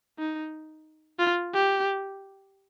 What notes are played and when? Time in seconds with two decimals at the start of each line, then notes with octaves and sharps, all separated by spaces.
0.19 D#4
1.19 F4
1.54 G4